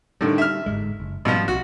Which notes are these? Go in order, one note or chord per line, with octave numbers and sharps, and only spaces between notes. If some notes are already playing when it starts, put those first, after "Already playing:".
A2 D3 D#3 G3
E5 F6
G1 G#2 G#3
F#1
G#2 B2 F3 G3
B1 F#4